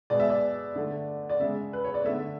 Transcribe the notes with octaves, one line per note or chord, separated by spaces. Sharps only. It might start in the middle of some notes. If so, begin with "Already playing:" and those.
B2 G#3 D5
E5
D5
D3 A3
D5
C#3 G#3 E5
B4
C#5
D5
D3 A3 E5